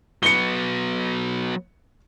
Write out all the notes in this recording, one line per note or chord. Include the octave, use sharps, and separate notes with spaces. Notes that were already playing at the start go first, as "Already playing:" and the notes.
F#3 B3 C#7 G7